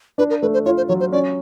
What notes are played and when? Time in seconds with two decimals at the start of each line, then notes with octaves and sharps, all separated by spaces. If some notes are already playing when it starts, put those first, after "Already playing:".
0.18 D4 B4
0.30 A#4
0.42 A3 B4
0.54 C5
0.65 F4 C#5
0.77 C5
0.88 F#3 C#5
1.00 C5
1.12 C#4 D5